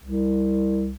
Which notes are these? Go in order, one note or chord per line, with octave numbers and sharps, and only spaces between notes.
C2